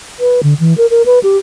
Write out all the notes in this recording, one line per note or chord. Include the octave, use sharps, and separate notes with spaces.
B4
D3
E3
A#4
A#4
B4
G4